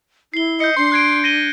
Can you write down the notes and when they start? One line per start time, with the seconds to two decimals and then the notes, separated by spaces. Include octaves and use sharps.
0.34 E4 C7 G7
0.60 D#5 G6 C#7
0.77 D4 C6
0.92 F#6 G#6 D7
1.24 A#6 D#7 G7